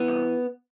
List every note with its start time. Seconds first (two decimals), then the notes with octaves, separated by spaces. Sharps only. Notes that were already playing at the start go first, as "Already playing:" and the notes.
Already playing: E3 B3
0.08 C2